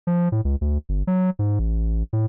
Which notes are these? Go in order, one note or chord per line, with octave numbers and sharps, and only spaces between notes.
F3
A2
C#2
D2
G1
F#3
G#2
A1
A2